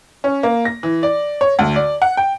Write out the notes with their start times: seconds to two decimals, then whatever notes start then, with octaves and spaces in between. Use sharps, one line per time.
0.24 C#4
0.43 A#3
0.65 A#6
0.83 E3
1.03 D5
1.41 C#5
1.59 D2
1.76 D5
2.02 F#5
2.17 G5